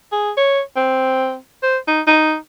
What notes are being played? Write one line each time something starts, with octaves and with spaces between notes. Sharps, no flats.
G#4
C#5
C4
C5
D#4
D#4